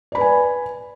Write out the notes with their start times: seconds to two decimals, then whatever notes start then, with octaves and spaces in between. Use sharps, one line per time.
0.12 D5
0.15 B5
0.18 B4
0.21 G#5